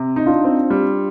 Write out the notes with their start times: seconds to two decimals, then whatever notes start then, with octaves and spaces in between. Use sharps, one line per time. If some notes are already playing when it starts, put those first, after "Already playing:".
Already playing: C3
0.16 D#4
0.26 D4 F4
0.44 C4
0.70 G3